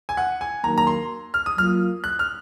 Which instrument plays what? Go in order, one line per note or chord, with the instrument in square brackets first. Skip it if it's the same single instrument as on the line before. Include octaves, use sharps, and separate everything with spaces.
[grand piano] G#5
F#5
G#5
[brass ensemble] D#3 F#3 A#3 [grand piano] A#5
[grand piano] A#5
C6
F6
D#6
[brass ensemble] F#3 A#3 F4 [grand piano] F6
[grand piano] F#6
F6